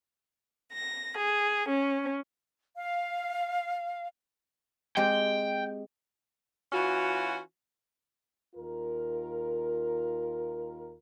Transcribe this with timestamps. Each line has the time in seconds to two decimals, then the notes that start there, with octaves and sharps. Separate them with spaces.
0.73 A#6
1.17 G#4
1.67 C#4
2.77 F5
4.97 G#3 C4 G4 G5
6.72 E3 C#4 F4 F#4
8.56 D#2 F4 A#4